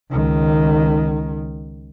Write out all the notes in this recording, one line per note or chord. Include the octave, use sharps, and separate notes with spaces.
C#2 D#3